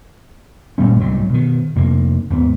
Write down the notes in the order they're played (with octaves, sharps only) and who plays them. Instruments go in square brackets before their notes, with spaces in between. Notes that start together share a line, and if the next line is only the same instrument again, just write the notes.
[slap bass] G#1 A#2 G3 C#4
C2 G#2 F#3 G3
B2 D#3
F2 C3 A#3
D#2 G#2 B3